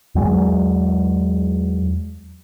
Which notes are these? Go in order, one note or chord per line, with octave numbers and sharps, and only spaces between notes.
E2 F#3 G#3